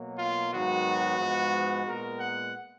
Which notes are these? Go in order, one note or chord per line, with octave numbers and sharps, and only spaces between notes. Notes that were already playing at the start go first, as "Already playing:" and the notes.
Already playing: B2 F#3 A#3
F4
G#2 D#3 F#3 B3 F#4
G#2 F3 G#3 B3
A#2 G#3 B3 A#4
F#5